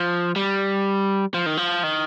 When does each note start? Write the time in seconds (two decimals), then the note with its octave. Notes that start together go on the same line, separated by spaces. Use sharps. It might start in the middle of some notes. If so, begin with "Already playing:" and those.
Already playing: F3
0.36 G3
1.34 F3
1.46 D#3
1.57 F3
1.83 D#3